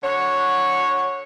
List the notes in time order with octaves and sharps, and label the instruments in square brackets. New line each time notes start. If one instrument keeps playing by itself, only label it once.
[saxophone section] D3 F#4 C#5